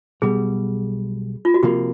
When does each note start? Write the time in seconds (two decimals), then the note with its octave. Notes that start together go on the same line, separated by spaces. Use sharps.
0.22 B1 B2 G3 G#4
1.45 F4
1.54 F#4
1.63 C3 F3 A#3 G4